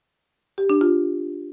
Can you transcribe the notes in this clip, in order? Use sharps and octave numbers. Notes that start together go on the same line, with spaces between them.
G4
D4
F4